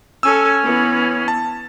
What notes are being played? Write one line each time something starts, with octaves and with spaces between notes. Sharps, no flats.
C#4 A4 G#5 E6
E3 B3
A5